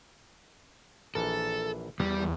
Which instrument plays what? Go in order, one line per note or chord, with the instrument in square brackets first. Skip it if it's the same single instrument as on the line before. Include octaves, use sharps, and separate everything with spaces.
[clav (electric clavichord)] A#1 E3 A#4 [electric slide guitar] A4
[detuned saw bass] E2 [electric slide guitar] G3